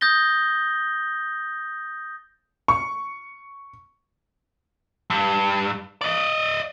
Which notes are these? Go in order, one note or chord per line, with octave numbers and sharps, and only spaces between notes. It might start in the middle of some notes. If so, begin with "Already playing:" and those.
D#6 G6 A6 A#6 G7
C#6
G2
D5 D#5